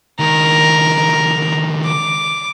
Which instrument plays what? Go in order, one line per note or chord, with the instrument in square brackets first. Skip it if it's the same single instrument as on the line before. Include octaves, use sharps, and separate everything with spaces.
[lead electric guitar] C#2 D#3 [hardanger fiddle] A#4
[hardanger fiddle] D6